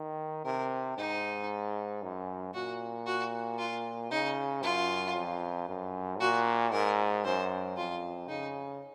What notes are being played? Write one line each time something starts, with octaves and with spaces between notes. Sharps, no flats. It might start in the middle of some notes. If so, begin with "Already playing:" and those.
Already playing: D#3
C3 A#4
G#2 D#4
F#2
A#2 F#4
F#4
F4
C#3 D#4
F#2 F4
F2
F#2
A#2 F#4
G#2 A#4
F#2 C5
F2 F4
C#3 D#4